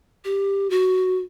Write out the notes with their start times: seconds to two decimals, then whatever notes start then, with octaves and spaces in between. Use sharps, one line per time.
0.25 G4
0.70 F#4